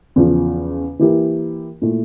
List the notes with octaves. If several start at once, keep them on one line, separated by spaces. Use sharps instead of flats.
E2 C#3 F3
E3 A#3 E4 G4 A#4
A#2 A3 E4